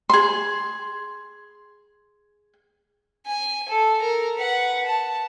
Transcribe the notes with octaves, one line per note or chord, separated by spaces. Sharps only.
G#4 C6
G#5
A4
A#4
B4 F#5
A5